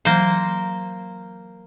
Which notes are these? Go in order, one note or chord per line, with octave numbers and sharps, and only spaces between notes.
E3 F#3 A#3 C5